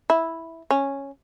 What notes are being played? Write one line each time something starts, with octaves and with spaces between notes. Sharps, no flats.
E4
C#4